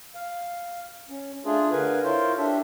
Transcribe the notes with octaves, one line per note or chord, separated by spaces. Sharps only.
F5
C#4
A3 D4 F4 G#4
D3 A#4 B4 F5 G#5
E4 F4 A#4 C5 C#5 F5
D4 G4 A4 E5